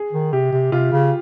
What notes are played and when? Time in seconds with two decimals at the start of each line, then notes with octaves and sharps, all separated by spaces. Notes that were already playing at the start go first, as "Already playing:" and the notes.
Already playing: G#4
0.13 D#3
0.32 C3 G4
0.52 C3
0.72 C3 F4
0.92 C#3